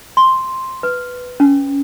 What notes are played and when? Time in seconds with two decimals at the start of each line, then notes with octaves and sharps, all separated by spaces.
0.17 C6
0.83 B4
1.40 C#4